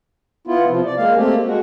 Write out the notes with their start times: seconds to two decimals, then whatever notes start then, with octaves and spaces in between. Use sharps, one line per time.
0.47 B3 E4 F4
0.68 C3 F3
0.85 D5
0.98 G#3 A#3 F5
1.17 A3 A#3 C4 G4
1.46 G#3 F#4